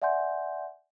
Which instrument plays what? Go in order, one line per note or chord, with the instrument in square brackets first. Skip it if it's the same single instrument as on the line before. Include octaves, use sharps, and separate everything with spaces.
[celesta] D5 E5 F#5 G#5 C6 G6